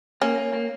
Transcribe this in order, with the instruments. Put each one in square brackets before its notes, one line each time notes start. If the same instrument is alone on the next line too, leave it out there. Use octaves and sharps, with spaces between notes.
[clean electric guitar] A#3 [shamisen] C#4
[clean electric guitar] A#3
A#3